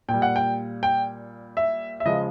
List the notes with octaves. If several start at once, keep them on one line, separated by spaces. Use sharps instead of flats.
A#2 G5
G3
F#5
G5
G5
E5
E5
C#3 F3 G#3 D#5